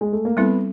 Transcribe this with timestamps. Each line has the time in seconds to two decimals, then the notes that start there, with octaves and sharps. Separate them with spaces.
0.01 G#3
0.13 A3
0.25 A#3
0.37 G3 B3 C4 E4 A4